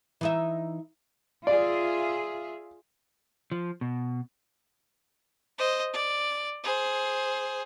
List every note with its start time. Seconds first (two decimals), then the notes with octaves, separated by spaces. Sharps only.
0.21 E3 D#4 E5
1.47 F4 G#4 D5 E5
3.52 F3
3.81 B2
5.58 C5 D#5
5.93 D5
6.64 G#4 C5